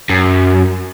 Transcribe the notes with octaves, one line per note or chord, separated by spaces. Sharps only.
F#2